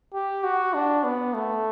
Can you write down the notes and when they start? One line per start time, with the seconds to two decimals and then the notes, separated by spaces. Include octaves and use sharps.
0.14 G4
0.44 F#4
0.74 D4
1.04 B3
1.34 A3